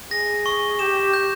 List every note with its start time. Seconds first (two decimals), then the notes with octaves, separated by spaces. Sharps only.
0.11 G#4 A#6
0.46 C#6
0.79 G4 E7
1.13 G6